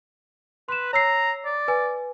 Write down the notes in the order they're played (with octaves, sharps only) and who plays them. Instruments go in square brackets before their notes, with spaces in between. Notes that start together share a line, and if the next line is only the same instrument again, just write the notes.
[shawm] B4 [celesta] C6 E7
[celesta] C#5 E6 C7 [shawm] A#5
[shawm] D5
[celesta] B4 G#5